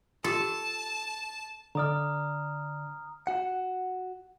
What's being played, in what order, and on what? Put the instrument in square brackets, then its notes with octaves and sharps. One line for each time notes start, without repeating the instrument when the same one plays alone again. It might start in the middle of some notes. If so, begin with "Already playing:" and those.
[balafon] F4 G4 [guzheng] A4 [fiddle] A5
[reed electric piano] D3 D5 [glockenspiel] A#5 D#6 F6
[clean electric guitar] F#4 F#5